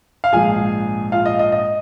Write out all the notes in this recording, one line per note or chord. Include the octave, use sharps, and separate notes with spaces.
F5
A#1 G#2 F3 G#3 G#4 G#5
F4 F5
D#5
D#5
D#5